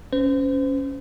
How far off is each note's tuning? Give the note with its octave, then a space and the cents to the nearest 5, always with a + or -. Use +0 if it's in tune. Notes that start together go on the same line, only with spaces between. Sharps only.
C#4 +0 C5 -35